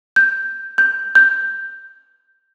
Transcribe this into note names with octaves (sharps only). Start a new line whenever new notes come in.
G6
G6
G6